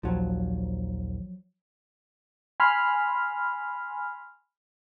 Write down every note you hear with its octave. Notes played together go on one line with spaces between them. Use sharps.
A#1 D#2 F3 F#3
G#5 B5 C6 F6